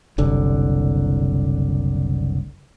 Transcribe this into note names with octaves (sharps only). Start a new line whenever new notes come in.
F#1 C2 D3